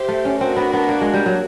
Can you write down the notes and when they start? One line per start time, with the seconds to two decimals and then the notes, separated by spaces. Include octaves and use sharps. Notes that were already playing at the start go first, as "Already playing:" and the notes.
Already playing: G4 C5 E5
0.08 A3
0.25 C#4
0.40 C4 D4 F#4 A#4
0.56 B3
0.73 B3
0.89 A#3
1.01 G#3
1.14 G3
1.26 F#3